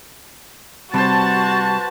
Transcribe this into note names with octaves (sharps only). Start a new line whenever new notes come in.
C3 G3 F#4 B4 C5 A5